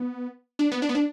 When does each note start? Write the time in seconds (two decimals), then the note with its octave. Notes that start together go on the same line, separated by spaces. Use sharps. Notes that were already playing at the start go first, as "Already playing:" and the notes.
Already playing: B3
0.59 D4
0.72 B3
0.82 D4
0.89 B3
0.95 D4